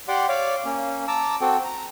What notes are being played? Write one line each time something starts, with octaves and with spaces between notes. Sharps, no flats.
G4 D5 F#5 C6 D6
C#5 D5 F5 D6
A#3 C#4
A5 A#5 D6 E6
C4 F#4 A4 G5
A#5